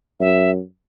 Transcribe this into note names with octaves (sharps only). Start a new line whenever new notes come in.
F#2 E5